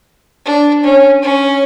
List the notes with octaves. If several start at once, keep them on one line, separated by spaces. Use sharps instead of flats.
D4
C#4
C#4